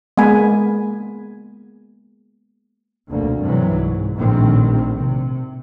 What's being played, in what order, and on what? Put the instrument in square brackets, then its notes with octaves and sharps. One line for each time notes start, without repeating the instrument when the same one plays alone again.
[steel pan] G#3 A#3 B3 G#5 B5
[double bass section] F1 D2 B2 A#3
G2 C3 E3 F#3
C2 G#2
A#1 A2 D#3 C4
C3